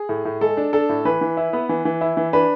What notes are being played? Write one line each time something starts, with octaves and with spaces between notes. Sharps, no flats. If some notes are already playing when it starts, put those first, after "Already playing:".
Already playing: G#4
A2
A2
G#3 A4
D4
D4 A4
A2
E3 B4
E3
E4
B3
E3
E3
E4
E3
D4 B4